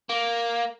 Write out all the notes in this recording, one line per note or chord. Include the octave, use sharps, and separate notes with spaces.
A#3